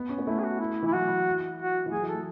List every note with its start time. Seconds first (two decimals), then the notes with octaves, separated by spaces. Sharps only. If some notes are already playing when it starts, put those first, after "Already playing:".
Already playing: B3
0.09 C#4
0.18 B3
0.27 A3 E4
0.39 G#4
0.44 F#4
0.60 E4
0.82 E3 E4
0.93 F#3 F#4
1.09 E3
1.59 F#4
1.86 E3
1.92 F#3 G#4
2.03 E3
2.09 A4
2.15 F#3